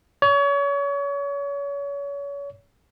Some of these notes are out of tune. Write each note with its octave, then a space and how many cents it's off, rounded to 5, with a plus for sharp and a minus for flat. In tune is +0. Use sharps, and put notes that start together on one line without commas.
C#5 +30